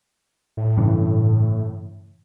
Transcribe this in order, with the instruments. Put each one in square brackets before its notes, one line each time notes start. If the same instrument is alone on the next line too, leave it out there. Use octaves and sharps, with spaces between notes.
[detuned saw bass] A2
[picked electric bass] G2 C#3 E3